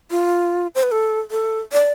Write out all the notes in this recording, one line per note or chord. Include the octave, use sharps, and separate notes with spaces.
F4
C5
B4
A4
A4
D5